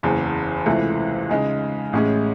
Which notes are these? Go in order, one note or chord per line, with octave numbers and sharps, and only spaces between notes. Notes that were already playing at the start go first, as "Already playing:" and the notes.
F#1 E2 C#3
C#2 C3 E3 A3
C#3 G#3 D#4 G#4
A1 A2 G#3 C#4 G#4